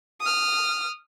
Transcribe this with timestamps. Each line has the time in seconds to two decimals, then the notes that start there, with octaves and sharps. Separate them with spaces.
0.21 D#6 F6